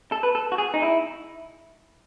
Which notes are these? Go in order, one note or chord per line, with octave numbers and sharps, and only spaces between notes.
A4
B4
A4
F#4
G#4
D#4
E4